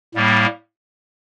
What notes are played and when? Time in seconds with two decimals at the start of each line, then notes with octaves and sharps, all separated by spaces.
0.15 A2 G3 A#3